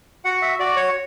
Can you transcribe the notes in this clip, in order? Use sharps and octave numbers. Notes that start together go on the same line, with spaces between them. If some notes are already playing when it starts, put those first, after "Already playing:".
F#4 F#5
E5
F#4 D5
C#5